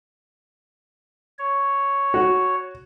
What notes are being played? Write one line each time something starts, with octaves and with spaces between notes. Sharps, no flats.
C#5
F#4